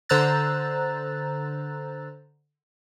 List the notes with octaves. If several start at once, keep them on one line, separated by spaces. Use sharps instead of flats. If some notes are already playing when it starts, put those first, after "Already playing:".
D3 C5 A#5 E6 F#6 A6